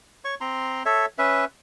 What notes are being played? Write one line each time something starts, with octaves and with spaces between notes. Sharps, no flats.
C#5 C#6
C4 A#5 C6
A4 C#5 E5
C#4 B4 E5